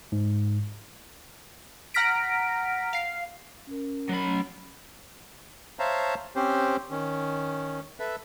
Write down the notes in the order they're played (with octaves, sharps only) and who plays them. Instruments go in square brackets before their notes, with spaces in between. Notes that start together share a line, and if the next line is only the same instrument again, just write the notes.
[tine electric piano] G#2
[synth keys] F#5 A#5 F6 A#6 B6 D7
F5 C7
[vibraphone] C#4 A#4
[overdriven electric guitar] F#3 B5
[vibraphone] A3 C#4
[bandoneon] C5 C#5 E5 F5 A5 A#5
C4 C#4 G4 C5
D#3 C#4
A4 B4 E5